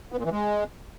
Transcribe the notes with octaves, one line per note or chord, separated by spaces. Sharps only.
B3
A#2
E3
G#3